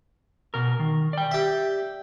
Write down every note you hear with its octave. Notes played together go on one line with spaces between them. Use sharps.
B2 A#4
D#3
D5 G5
G4 E5